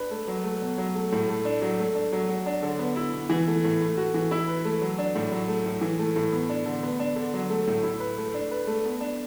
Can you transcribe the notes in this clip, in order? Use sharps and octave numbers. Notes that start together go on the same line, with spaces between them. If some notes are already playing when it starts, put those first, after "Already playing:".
Already playing: D4 B4
A3
F#3
A3
B2
F#3
A3
A2
A3
D4
F#3
A3
D4
F#3
F#3
D4
D3
B3
E4
B2
E3
A3
A2
A3
F#4
E3
E4
B4
A3
F#3
D4
A2
F#3
A3
A2
E3
A3
A2
B3
D4
D3
B3
D4
D3
F#3
A3
A2
E4
B4
A3
D4
B4
A3
B3
D4